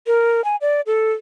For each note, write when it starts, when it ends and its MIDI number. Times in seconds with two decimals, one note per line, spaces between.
0.07 0.44 70
0.44 0.56 80
0.61 0.81 74
0.87 1.13 69